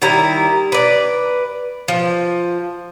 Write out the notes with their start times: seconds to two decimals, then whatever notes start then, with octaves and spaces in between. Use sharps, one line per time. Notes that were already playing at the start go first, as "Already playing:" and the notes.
0.02 D#3 G3 E4 A#5
0.72 B4 D5
1.88 F3